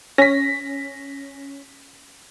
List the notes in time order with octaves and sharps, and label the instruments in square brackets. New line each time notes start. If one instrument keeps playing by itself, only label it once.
[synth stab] C#4 [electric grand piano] A#6 B6